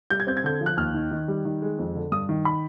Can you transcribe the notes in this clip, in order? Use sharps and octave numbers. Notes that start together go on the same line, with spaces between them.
G3 G6
G#6
C4 G6
G#6
D3 G6
F3
F#6
D#2 F6
D#3
D#3
G3
D#3
G#3
F2
D3
G2 D#6
D#3
B5